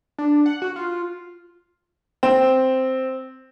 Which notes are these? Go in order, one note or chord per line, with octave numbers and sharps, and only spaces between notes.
D4
F#5
F#4
F4
C4